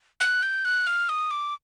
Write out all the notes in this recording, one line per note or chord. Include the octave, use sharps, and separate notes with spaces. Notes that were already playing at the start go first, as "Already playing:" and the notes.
F#6
G6
F#6
F6
D#6
D6